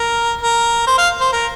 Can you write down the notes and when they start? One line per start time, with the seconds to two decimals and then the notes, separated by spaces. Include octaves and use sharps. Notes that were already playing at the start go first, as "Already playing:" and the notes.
Already playing: A#4
0.41 A#4
0.87 C5
0.98 F5
1.20 C5
1.32 A#4